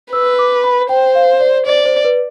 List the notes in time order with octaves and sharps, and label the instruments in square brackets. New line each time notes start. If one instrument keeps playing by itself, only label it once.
[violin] B4 [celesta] E6
[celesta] D6
B5
[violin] C5 [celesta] G5
[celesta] F5
D5
[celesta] C5 [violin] D5
[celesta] C5
B4